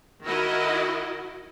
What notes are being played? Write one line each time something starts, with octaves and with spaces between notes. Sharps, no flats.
D#3 E4 F#4 A#4 D#5